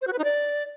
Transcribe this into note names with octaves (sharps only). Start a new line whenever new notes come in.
C5
F#4
B4
D#4
D5